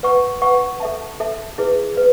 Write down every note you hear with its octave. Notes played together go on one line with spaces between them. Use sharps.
B4 F#5 C#6
B4 F#5 C#6
A4 E5 A5
A4 E5 A5
E4 G#4 B4
B4